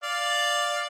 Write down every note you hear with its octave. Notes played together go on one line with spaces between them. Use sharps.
D5 F5